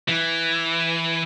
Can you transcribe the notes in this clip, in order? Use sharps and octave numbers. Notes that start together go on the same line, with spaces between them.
E3